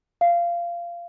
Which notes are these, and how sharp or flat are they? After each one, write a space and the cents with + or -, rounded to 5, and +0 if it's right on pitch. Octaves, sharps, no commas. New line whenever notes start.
F5 -20